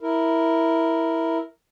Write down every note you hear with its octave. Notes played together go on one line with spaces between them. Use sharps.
E4 A#4